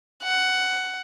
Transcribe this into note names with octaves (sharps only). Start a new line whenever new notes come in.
F#5